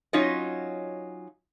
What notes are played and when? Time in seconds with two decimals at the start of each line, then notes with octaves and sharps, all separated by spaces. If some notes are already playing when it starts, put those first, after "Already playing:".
0.13 F#3 C#4 D#4 F4 C#5 D#5